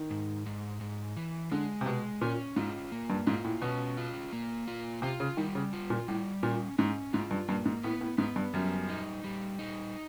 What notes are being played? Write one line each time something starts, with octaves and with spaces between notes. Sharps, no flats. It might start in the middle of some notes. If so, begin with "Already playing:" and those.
Already playing: D#3
G#2
G#2
G#2
E3
D3 G#3
C3
B2 G#3
A#2 C#4
G#2 F4
A#3
G2
G#2 F4
A2
B2 C#4
F4
A#3
F4
C3 F4
C#3
D#3 G3
C#3
F4
A#2
A2 G3
A#2 C#4
G#2 C#4
G#2 F4
G2
G2 A#3
G#2
A2 B3
A2
G#2 B3
G2
F#2 G3
D#4
G3
D#4